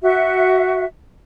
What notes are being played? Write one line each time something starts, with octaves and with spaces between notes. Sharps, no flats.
F#4 E5